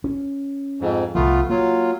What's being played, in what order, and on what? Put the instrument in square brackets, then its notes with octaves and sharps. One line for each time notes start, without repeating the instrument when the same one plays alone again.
[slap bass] C#4
[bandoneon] F2 G#2
[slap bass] C2 F3 [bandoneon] A3 B3 F4
[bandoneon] F#3 F4 [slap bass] A#3